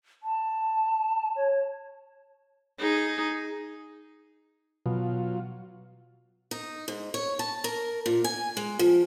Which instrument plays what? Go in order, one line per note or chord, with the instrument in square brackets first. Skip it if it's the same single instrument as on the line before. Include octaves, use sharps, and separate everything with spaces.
[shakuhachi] A5
C#5
[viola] D#4 G#4
[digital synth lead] B2 [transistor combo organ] F#3 F4
[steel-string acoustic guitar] D#4
G#2
C#5
A5
A#4
A#2
G#5
G#3
F3